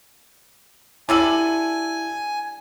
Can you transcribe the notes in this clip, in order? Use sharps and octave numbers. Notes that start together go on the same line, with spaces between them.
D3 G3 E4 A4 G#5 D#7 F#7